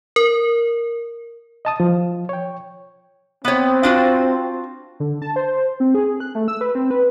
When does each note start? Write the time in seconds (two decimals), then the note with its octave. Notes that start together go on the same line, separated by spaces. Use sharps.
0.16 A#4
1.65 D#5 A5 D#6
1.80 F3
2.29 C#5 G5
3.45 B3 C4 C#5
3.83 D4 F4 F#4
5.00 D3
5.22 A5
5.36 C5
5.80 C4
5.95 G#4
6.20 F#6
6.35 A3
6.48 E6
6.61 B4
6.75 C4
6.91 B4